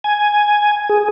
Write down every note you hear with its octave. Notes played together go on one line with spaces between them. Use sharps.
G#5
G#4